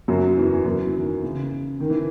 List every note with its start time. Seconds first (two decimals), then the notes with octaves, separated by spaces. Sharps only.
0.08 F#2 F#3
0.37 E2 E3
0.65 F#2 F#3
0.86 E3
0.94 D#3
1.23 C#3
1.80 D#3
1.90 E3